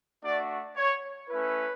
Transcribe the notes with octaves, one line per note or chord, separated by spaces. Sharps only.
A3 D4 F#4 D5
C#5
A3 C#4 E4 B4